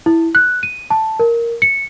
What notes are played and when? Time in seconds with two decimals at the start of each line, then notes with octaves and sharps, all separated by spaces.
0.06 E4
0.35 F#6
0.63 D#7
0.90 A5
1.19 A#4
1.62 C#7